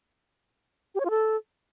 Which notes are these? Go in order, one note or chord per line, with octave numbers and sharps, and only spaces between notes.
G4
C#5
F4
A4